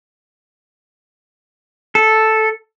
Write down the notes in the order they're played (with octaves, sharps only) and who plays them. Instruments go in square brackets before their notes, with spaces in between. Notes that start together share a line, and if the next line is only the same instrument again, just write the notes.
[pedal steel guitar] A4